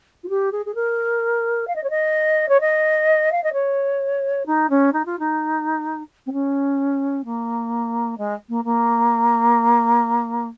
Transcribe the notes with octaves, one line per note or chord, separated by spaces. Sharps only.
F4
G4
G#4
G#4
A#4
F5
D#5
C#5
D#5
C#5
D#5
F5
D#5
C#5
D#4
C#4
D#4
F4
D#4
C4
C#4
A#3
G#3
A#3
A#3